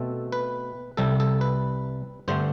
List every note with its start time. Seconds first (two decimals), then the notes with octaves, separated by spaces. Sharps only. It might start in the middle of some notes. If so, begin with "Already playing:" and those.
Already playing: B2 A3 C4 A4
0.32 B4
0.97 C2 C3 G3 A4
1.20 A4
1.41 B4
2.28 G2 D3 A3 C4 C5